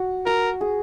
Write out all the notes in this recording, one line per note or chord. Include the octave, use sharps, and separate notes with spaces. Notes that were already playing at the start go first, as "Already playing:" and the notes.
Already playing: F#4
F#4 A#4
G#4